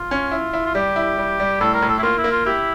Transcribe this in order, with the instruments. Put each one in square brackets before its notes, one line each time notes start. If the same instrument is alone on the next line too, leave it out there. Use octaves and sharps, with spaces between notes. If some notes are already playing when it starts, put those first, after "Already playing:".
Already playing: [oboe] F4
[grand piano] C#4
E4
E4
[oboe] F4
[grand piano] G3 [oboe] G4
[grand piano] E4
G3
G3
[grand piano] A2 [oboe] A4
[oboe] A#4
[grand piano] A2
[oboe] A4
E4
[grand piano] A#3 [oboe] F4
[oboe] E4
[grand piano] A#3
[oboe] F4
[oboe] E4 [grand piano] G4